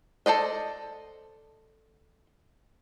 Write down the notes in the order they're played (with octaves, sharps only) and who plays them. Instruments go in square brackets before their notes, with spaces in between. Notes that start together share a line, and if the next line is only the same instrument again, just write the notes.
[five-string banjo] A4 C5 D5 D#5